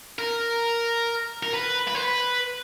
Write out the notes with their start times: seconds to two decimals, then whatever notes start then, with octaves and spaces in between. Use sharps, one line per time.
0.19 A#4
1.43 A#4
1.54 B4
1.88 B4
1.95 C5
2.03 B4